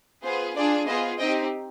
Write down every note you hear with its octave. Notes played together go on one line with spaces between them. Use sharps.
B3 F4 G#4 C5
D4 F4 G#4 D5
B3 F4 G#4 C5 D#5
C4 D#4 G4 D#5 G5